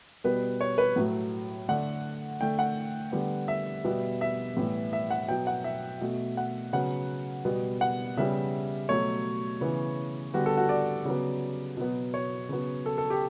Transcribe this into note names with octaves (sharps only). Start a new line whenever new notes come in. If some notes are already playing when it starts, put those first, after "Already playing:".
B2 G3 B3 B4
C#5
B4
A2 F#3 A3
D3 A3 F#5
D3 A3 G5
F#5
D3 G3 B3
E5
B2 G3 B3
E5
A2 E3 G3 B3
E5
F#5
B2 F#3 B3 G5
F#5
E5
B2 A3
F#5
C#3 F#3 B3 F#5
B2 G3 B3
F#5
C#3 G3 B3 E5
B2 F#3 A3 C#5
C#3 E3 B3
D3 G3 B3 F#4
A4
F#4
D5
C#3 F#3 B3
B2 F#3 B3
C#5
C#3 F#3 B3
A4
A4
G4